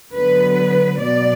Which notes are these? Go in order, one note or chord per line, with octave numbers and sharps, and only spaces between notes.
D3 F#3 B3 B4
B2 F#3 B3 D5